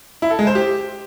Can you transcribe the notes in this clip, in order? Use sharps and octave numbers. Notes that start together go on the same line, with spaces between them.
E4
A4
G#3
C5
G4